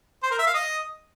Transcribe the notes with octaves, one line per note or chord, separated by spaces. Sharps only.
C5
A#4
E5
F5
D#5